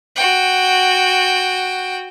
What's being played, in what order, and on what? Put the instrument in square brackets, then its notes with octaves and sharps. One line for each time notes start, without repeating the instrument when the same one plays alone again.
[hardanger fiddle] F#4 G5